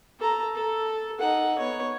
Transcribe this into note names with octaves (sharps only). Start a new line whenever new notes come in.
A4 A#5
A4
D#4 F#5
B3 C#5